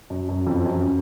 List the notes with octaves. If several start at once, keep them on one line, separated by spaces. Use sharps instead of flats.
F#2
F#2
F2
F#2